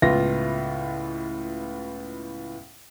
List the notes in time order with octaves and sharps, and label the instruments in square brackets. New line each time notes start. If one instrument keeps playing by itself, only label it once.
[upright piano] C#2 A2 B3 E4 F4 A#6